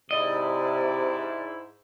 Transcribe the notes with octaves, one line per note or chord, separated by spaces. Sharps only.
G#2 C3 E4 D5 D#5